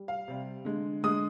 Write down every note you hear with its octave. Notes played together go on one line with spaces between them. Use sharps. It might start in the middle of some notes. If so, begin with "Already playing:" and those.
Already playing: G3
F5
C3 G3
D3 G#3
D3 G#3 D#6